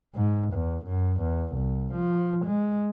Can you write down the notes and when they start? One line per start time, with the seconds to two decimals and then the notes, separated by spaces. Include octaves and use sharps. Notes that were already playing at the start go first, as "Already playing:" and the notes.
0.15 G#2
0.53 E2
0.86 F#2
1.21 E2
1.54 C2
1.94 F3
2.46 G#3